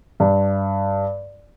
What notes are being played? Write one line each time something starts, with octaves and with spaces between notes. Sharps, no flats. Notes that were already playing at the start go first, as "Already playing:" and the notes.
G2